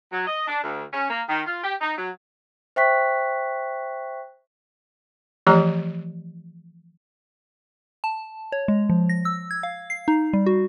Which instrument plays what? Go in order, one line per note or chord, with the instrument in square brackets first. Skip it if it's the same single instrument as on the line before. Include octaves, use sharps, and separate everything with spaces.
[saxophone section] F#3
D#5
D4
D2
C#4
A#3
D#3
F4
G4
D#4
F#3
[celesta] C5 E5 G5 C#6 F#6 B6
[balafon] E3 F3 A3 G4 C#5 A#5
[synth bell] A5
C#5
G#3
F3
A#6
E6
G#6
F5
C7
D#4
G3
F#4